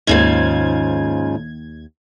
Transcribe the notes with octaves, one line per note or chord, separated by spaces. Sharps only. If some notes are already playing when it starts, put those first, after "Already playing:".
D#2 G#2 C#3 F3 G#6